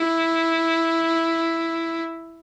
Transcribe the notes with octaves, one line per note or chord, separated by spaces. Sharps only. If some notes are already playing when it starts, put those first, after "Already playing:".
Already playing: E4